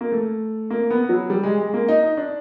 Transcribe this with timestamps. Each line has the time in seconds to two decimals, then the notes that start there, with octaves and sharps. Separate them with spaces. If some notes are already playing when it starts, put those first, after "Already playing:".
0.01 A#3
0.12 A3
0.70 A#3
0.90 B3
1.09 F#3
1.30 G3
1.43 G#3
1.58 G#3
1.74 A#3
1.88 D#4
2.03 D#4
2.17 D4